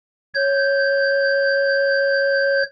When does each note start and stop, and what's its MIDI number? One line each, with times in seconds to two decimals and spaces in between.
0.35 2.63 73
0.35 2.63 91